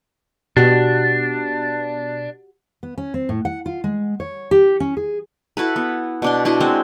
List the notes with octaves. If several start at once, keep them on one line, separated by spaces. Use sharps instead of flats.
B2 D4 F#4 G4
B3
C#4
C4
A2
F#5
F4
G#3
C#5
G4
C#4
G#4
E4 F#4 A4 B4
B3
B2 D4 C6
D4 E4 F#4 D#5
G#3 C4 C5